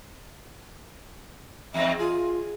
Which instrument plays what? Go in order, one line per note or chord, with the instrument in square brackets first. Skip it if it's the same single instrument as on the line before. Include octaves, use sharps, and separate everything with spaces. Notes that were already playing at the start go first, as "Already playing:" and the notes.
[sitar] E2 G#2 C4 [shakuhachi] E5
[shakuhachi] F4 [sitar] G#4